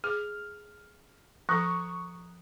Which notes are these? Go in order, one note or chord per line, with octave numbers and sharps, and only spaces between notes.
G#4 F6
F3 A4 A#5 C#6 D#6 F#6